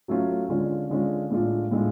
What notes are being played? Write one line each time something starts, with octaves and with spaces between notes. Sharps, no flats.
F#3 A3 C#4 F4
D3 G#3 C#4 F4
D3 G#3 C#4 F4
A2 G#3 D4 F4
A2 G#3 D4 F4